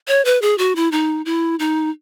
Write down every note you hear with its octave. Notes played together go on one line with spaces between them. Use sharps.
C#5
B4
G#4
F#4
E4
D#4
E4
D#4